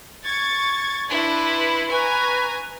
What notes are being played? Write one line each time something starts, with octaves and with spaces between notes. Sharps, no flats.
C#6 G#6 A6
D4 E4 B4 C6
B4 G#5 A#5 C#6